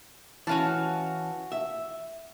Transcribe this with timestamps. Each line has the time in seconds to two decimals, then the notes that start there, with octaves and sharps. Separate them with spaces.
0.47 E3 C#4 F#4 F5 A5
1.52 E5